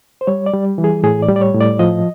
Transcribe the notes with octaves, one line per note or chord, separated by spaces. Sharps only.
C5
G3 C#5
D5
G3
E3
G#4
A2 G#4
D5
G3
D5
C#5
A2
D5
F3 D#5